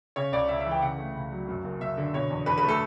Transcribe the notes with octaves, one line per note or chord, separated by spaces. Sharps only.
C#3 C#5
C#2 D5
C#2 E5
E5
E3
G5
C#3 F#5
A3
C#2
F#3
F#2
F#1
F#1 E5
D3
B2 C#5
E2
E2 B4
B4
A3
A4